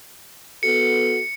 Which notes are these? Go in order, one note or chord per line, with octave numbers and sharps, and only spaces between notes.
B3 F#4 A4 C#7